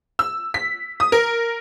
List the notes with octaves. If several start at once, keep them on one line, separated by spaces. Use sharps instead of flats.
E6
B6
D#6
A#4